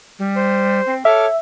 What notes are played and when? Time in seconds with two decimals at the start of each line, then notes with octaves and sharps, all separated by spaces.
0.18 G3
0.36 C5
0.86 C4
1.05 A4 C#5 E5 D6 F6